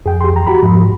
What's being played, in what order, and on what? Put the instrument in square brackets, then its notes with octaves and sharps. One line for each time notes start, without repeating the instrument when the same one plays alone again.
[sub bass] F2 [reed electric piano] G#4 G5
[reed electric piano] G4 C6
E2 A#5
F#4 G4 B5
[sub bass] G#2 [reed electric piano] F3
[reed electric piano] C2